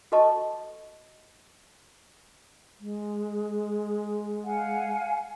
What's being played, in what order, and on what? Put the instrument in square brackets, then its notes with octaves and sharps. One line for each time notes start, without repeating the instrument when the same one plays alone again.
[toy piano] F#4 A4 B4 D#5 A5 C#6
[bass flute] G#3
[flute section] F5 F#5 G#5